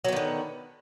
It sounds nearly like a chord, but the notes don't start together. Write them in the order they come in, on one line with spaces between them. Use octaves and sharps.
F#3 B3 D#3 D3